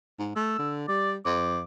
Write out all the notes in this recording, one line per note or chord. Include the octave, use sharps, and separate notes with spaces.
G#2
A3 E6
D3
G3 D5
F2 D6